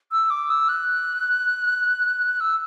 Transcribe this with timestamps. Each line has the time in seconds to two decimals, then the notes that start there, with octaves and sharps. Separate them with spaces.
0.12 E6
0.30 D6
0.50 E6
0.68 F#6
2.40 E6